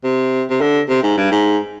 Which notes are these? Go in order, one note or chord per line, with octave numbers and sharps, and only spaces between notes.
C3
C3
D3
C3
G#2
G2
G#2